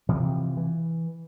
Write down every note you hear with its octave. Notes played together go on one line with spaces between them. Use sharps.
C3 E3 F3
E3